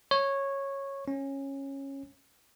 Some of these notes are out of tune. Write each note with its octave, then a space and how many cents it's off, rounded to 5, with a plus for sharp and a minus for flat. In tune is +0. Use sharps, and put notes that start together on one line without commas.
C#5 -10
C#4 -15